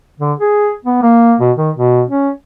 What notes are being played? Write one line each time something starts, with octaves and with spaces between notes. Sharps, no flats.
D3
G#4
B3
A#3
B2
D#3
B2
C#4